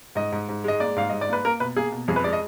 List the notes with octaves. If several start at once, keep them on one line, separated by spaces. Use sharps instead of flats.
G#2 D#5
G#2
G#2
G#3 D#5
A#3 D5
G#2 F5
G#2 D#5
D5
A#3 B4
A#3 A#4
B2 B4
A#3 G#4
B2
F2 G#4
B4
G#3 D5
D#5